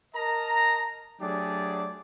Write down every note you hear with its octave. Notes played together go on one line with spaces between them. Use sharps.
A#4 D#5 A5 A#5
F#3 A3 D4 G4 G#4 D5